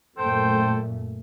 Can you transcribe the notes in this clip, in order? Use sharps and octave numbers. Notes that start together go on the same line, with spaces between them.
F#2 A#2 A3 A4 C5 G5